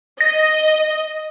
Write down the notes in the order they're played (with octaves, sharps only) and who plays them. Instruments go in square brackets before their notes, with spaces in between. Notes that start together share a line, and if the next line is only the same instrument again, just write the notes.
[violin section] D#5 [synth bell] A#6